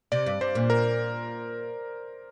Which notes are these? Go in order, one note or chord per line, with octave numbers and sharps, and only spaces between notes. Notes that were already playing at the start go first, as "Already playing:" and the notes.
C3 D5
G2
G2 C5
A#2
A#4